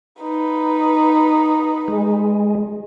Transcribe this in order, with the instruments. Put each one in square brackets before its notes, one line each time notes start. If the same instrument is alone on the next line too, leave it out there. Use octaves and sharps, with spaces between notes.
[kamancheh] D#4 B4
[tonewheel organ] G#3